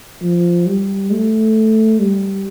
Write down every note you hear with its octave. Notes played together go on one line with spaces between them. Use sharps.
F3
G3
A3
G3